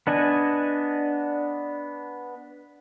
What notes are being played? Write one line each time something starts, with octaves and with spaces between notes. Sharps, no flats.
B3 D4 D#5 G#5